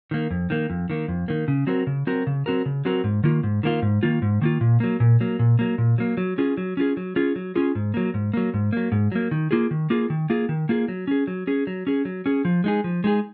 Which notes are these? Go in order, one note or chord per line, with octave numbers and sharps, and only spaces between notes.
D#3 A#3
F2
D#3 A#3
F2
D#3 A#3
F2
D#3 A#3
C#3
F#3 C4 F#4 A#4
C#3
F#3 C4 F#4 A#4
C#3
F#3 C4 F#4 A#4
C#3
F#3 C4 F#4 A#4
G#2
D#3 A#3 F4
G#2
D#3 A#3 F4
G#2
D#3 A#3 F4
G#2
D#3 A#3 F4
A#2
F#3 A#3
A#2
F#3 A#3
A#2
F#3 A#3
A#2
F#3 A#3
F#3
C#4 F4 G#4
F#3
C#4 F4 G#4
F#3
C#4 F4 G#4
F#3
C#4 F4 G#4
G#2
F#3 A#3
G#2
F#3 A#3
G#2
F#3 A#3
G#2
F#3 A#3
D#3
A#3 F4 G#4
D#3
A#3 F4 G#4
D#3
A#3 F4 G#4
D#3
A#3 F4 G#4
F#3
C#4 G#4
F#3
C#4 G#4
F#3
C#4 G#4
F#3
C#4 G#4
F3
G#3 D#4 G#4
F3
G#3 D#4 G#4